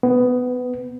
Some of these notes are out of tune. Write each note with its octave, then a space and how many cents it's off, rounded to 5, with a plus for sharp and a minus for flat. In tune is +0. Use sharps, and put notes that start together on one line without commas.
B3 +15